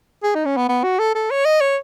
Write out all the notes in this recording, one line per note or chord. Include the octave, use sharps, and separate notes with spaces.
G#4
D#4
C#4
B3
B3
F#4
A4
A4
C#5
D#5
C#5